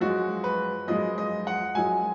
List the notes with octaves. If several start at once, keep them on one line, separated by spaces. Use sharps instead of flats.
F#2 F3 G#3 F#4
B4
F#2 F3 G#3 D#5
D#5
F#5
F#2 F3 G#3 G#5